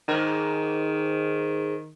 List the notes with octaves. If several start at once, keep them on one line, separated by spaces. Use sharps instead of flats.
G#2 D#3 A#4